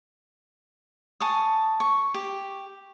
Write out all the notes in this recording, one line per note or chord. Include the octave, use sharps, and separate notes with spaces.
G#5 A5 C#6 D#6
C#6
G4